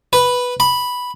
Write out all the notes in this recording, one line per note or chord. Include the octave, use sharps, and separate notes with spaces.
B4
B5